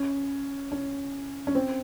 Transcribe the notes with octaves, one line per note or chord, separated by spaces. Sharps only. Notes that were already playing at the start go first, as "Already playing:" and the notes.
Already playing: C#4
C#4
C#4
C4